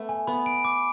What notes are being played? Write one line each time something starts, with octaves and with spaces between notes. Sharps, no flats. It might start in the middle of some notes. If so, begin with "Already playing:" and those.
Already playing: A3 B3
G#5
B3 B5
D7
D6